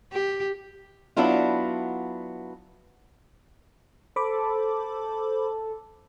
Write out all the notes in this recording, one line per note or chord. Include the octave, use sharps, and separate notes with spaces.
G4
F#3 B3 D4 E4 F4
A4 C5 B5 D6